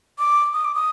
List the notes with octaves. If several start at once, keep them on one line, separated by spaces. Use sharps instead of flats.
D6
D#6
D6
D#6